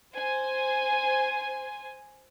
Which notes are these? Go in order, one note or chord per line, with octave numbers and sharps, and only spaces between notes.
C5 G#5